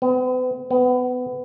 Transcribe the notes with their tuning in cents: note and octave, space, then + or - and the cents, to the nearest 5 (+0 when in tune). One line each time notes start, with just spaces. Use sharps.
B3 +45
B3 +25